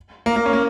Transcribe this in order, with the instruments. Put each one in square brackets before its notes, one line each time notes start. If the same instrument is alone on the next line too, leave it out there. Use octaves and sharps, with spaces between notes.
[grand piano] A#3
A#3
C#4
A#3